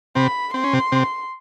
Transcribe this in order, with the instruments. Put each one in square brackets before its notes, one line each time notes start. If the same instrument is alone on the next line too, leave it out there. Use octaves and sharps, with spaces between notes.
[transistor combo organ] C3 C4 [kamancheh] B5
[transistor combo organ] C4 [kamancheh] C6
[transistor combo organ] C#4
C3 C4
C3 C4